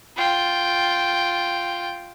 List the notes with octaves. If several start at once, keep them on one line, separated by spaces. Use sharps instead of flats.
F4 G5